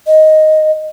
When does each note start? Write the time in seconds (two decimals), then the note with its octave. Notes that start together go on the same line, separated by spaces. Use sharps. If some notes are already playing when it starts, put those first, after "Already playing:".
0.07 D#5